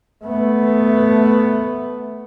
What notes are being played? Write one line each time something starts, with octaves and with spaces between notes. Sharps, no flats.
A3 B3